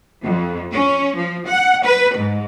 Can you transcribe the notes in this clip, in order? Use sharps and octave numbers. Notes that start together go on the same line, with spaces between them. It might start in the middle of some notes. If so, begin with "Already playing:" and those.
F2
C#4
F3
F#5
B4
G#2